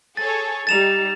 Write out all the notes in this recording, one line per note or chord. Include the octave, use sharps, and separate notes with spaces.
G#4 A4 C#5 A6
G3 D#4 A6 E7 F7